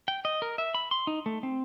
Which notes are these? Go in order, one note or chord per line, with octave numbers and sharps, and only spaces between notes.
G5
D#5
A#4
E5
B5
C6
D#4
A3
C4